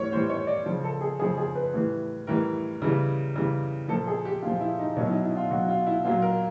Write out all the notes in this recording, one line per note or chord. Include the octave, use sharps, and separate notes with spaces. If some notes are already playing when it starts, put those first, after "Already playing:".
Already playing: A2 E3 G3 C#5
A2 E3 G3 C5
C#5
D5
C#3 F3
A4
G#4
C#3 F3 G#4
G#4
B4
A2 E3 G3
A2 E3 G3 A#4
C#3 E3 G3
C#3 E3 G3
A#2 F3 A4
G#4
G4
A#2 F3 F4
E4
D#4
B2 F#3 C#4
E4
D#4
E4
F4
B2 F#3 F#4
F4
E4
A#2 F#3 F4
A#4